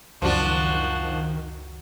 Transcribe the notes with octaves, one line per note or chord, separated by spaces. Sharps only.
C#2 F#2 D#3 F3 D4 F#4